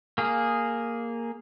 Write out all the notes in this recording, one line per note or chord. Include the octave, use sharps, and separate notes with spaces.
A#3 G#4